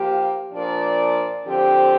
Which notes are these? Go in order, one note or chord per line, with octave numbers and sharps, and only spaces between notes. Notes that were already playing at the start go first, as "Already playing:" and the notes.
Already playing: F3 A#3 G4
A#2 F3 D4 A#4 D5
D3 F3 C4 G4